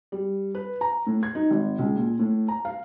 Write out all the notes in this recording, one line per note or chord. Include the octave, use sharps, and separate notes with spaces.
G3
B4
A#5
A2
G#6
D#4
G#1
C#2
A#2
A2
A#5
F5